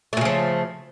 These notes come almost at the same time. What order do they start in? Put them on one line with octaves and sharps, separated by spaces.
A3 A#2 C#3 F3